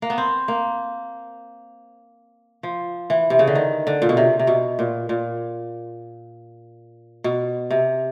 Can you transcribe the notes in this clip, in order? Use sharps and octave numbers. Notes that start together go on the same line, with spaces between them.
A#3
B3
C4
A#3
F3
E3
C3
C#3
D3
D#3
D3
A#2
B2
C3
C3
B2
A#2
A#2
B2
C3